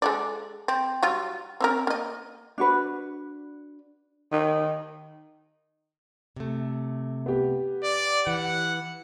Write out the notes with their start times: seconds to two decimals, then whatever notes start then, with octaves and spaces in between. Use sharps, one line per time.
0.02 G#3 A4 D5
0.68 C4
1.03 F#3 G3 F4
1.60 C4 C#4 A#4
1.87 A#3 D#5
2.58 D4 F#4 B4
4.32 D#3
6.36 C3 A3
7.26 B3 G4
7.83 D5
8.27 E3 F#5